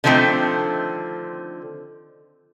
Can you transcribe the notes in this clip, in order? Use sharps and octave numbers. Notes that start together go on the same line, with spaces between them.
D3 D#3 F3 A3 C4